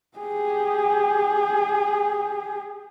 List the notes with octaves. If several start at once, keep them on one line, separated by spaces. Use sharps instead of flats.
G4 G#4